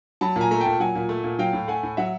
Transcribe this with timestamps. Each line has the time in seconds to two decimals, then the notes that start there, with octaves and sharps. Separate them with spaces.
0.21 F#3 A5 B5
0.36 A#2
0.41 G#5 A#5
0.51 A3 A#5
0.61 G5 A5
0.66 A#2
0.80 F#3 F#5 G#5
0.95 A#2
1.09 A3
1.24 A#2
1.39 F#3 F5 G5
1.53 A2
1.68 A3 F#5 G#5
1.83 A2
1.97 F#3 E5 F#5